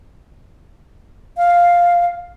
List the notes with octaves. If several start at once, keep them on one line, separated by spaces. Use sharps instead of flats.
F5